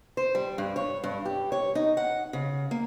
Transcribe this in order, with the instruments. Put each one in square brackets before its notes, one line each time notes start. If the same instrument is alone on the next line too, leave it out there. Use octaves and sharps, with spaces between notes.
[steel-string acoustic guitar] C5
G3
G2
C#5
G2
G4
C#5
D#4
F#5
C#3
A#3